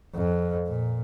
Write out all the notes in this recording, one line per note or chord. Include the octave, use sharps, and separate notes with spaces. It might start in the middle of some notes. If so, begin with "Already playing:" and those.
F2
A#2